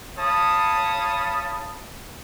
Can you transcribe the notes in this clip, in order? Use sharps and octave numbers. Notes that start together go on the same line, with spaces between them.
C#5 F5 A5 B5 D#6